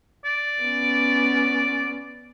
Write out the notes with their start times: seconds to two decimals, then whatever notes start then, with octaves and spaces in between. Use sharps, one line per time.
0.25 D5
0.62 B3 C#4